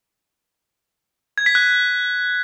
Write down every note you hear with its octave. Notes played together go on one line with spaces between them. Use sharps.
G#6
B6
F#6